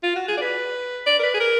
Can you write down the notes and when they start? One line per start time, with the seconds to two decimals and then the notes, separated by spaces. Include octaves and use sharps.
0.03 F4
0.16 F#4
0.28 G#4
0.37 D5
0.41 B4
1.06 D5
1.19 A#4
1.23 B4
1.34 G#4
1.40 A#4